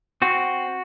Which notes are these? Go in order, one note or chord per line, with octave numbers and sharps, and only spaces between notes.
C4 F#4